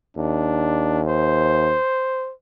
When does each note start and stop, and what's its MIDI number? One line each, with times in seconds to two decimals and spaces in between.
0.17 1.75 39
0.17 1.01 62
1.08 2.32 72